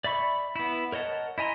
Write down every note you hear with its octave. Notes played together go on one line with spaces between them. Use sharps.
D5 E5 B5 C#6
B3 E4
A#4 C#5 D#5 F#5 A5
E4 D#5 G#5 A#5 C6